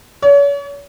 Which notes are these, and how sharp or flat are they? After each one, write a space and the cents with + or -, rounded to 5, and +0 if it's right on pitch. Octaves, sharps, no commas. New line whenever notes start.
C#5 +40